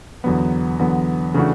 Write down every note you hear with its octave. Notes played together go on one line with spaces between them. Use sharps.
E2 D3 F#3 B3
E2 D3 F#3 B3
C#3 E3 A3 D4 F#4